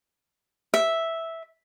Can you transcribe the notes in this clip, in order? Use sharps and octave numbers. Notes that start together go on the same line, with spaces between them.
E5